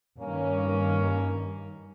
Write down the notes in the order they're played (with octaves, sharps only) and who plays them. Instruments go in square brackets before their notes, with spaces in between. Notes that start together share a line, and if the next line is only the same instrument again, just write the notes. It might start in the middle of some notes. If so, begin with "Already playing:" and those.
[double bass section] G2 D#3 [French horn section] A#3 C#4